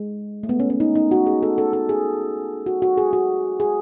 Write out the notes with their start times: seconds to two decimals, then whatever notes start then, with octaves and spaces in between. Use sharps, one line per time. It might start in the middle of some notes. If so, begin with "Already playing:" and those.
Already playing: G#3
0.43 A3
0.49 B3
0.60 C#4
0.70 C#4
0.80 D#4
0.95 D#4
1.11 F#4
1.27 G#4
1.42 A4
1.58 A4
1.73 A4
1.89 G#4
2.66 F#4
2.82 F#4
2.98 G#4
3.13 F#4
3.60 G#4